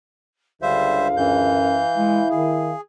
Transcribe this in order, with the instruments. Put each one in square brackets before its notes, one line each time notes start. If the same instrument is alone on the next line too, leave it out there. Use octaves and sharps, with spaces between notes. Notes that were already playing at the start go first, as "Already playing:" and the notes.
[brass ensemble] C#2 D3 [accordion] G3 C5 E5 [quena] F5
[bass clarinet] F#2 [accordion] E3 G6
[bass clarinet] G#3 [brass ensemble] E4
[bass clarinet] D#3 [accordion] G#4